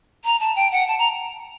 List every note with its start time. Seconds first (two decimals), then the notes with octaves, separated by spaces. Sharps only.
0.24 A#5
0.40 A5
0.56 G5
0.72 F#5
0.88 A5
0.98 A#5